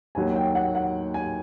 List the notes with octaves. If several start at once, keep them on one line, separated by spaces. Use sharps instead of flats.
D#2 D#3 F#3 G#5
G5
F#5
F#5
G#5